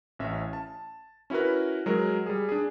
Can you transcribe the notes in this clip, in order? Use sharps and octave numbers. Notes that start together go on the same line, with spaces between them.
A1 C#4 E5
A5
C#4 E4 F#4 A#4 B4
F#3 G#3 A#4
G3 G#4
D4 G#4